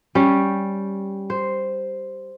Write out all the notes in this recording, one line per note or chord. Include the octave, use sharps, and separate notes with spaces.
G3 C#4 G4
C5